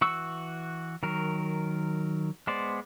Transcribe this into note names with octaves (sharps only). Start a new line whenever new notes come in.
E3 F#4 C#6 E6
D#3 F#3 A#4
G#3 B3 C5 D5